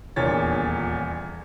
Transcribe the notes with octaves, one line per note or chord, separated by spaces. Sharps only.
D#1 E2 A#2 D4 C#5 A6